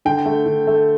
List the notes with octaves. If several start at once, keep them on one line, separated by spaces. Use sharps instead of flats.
D3 G5
A3
D3
A3